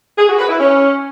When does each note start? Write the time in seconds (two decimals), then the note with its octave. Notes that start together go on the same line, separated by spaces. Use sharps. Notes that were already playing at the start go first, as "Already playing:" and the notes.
0.17 G#4
0.28 F#4
0.38 B4
0.48 E4
0.59 C#4